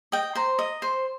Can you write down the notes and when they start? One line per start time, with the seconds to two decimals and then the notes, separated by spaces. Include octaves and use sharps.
0.12 D#5 G5
0.35 C5 A#5
0.59 D#5
0.82 C5